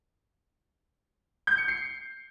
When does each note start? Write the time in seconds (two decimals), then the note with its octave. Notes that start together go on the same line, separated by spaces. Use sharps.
1.47 G6
1.58 C#7
1.68 C7